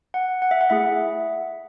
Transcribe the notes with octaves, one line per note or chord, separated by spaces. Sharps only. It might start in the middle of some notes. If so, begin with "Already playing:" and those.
F#5
F#5
E5
F#5
A3 E4 G#4 E5